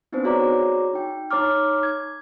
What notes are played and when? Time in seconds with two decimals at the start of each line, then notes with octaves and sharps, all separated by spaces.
0.12 B3 C4 D4 D#4 B4 C5
0.24 F#4 G#4 C#5 D5 A#5 D6
0.94 D#4 G5
1.31 D#4 C#5 A#5 D6 F6
1.83 G#6